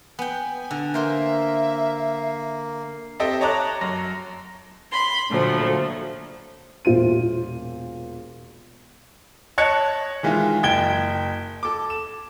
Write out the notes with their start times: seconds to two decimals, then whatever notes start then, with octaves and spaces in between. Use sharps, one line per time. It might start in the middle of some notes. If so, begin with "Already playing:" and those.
0.19 B3 G5 G#5
0.71 D3
0.94 A#3 A#4 C5 E5 C6
3.20 C4 G4 A4 D#5 E5
3.41 C#5 D#5 A5 A#5 D6 F#6
3.81 F#2 A#6
4.91 B5 C6
5.29 A#2 D3 F3 F#3 A3
6.85 E1 A#2 F4 C5 D#7
9.58 C#5 D#5 A5 F#6 G#6 C#7
10.23 D#3 E3 G#3 E4 F4
10.63 F#1 G5 G#6 D7 G7
11.63 A4 D6
11.90 E7